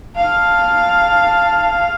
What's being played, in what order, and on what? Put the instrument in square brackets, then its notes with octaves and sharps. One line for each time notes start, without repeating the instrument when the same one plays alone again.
[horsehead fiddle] F5 [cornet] A5